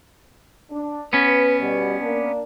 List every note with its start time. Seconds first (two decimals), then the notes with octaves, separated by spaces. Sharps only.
0.70 D4
1.13 B3 C#4 B4
1.60 B2 G3
2.00 A#3 D4